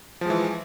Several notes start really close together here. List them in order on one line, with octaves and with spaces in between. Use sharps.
F3 G#3 E3